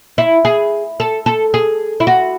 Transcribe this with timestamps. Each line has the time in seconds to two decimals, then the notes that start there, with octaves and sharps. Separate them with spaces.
0.18 E4
0.45 G#4
1.00 A4
1.26 A4
1.54 G#4
2.00 E4
2.07 F#4